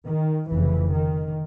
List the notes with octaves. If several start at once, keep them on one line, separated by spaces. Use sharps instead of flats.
D#3
F1 F2 C#3 E3
D#3